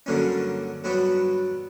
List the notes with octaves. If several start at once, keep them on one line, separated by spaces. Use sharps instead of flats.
G2 D3 F#3 A#3 C#4
G2 F#3 B3 F#4